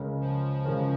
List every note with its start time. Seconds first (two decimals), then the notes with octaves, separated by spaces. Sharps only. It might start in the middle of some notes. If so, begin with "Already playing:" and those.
Already playing: C#2 C#3 G#3 C#4 A#4
0.21 F3
0.64 C#2 C#3 G#3 C#4 A#4